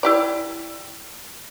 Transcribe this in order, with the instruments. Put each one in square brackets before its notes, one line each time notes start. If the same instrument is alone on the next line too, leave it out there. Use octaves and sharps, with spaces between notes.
[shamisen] E4 G4 D5